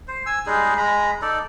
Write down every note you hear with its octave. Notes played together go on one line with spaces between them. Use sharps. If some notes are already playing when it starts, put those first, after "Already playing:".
C5
G#5 E6
G3 G#3 D#4 G#4
G#3 A#5 B5
D#4 A4 D5